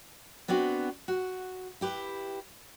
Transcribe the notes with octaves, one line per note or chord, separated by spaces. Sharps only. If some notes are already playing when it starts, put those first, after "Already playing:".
B3 C4 D4 F#4
F#4
E4 G4 B4